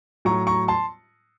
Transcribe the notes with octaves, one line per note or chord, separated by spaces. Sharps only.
A2 F#3 A#5 C#6
A#5 C#6
A5 C6